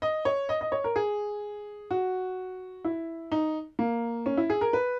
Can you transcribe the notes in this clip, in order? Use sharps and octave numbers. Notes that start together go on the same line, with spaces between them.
D#5
C#5
D#5
D#5
C#5
A#4
G#4
F#4
E4
D#4
A#3
C#4
E4
G#4
A#4
B4